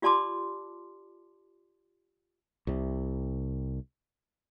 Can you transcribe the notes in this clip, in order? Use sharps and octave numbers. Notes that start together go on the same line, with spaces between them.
F4 G4 D5 A5 C6 D6
C2 C3